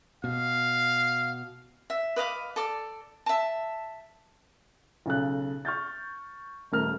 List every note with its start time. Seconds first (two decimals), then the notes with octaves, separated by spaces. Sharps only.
0.24 B2 F5
1.90 E5
2.16 B4 D#5 F5 D6
2.56 A4 D5
3.26 E5 A5
5.06 B1 C#3 A4 F#6
5.65 C#6 F6 G6 A6
6.72 D#1 A3 A#4 F6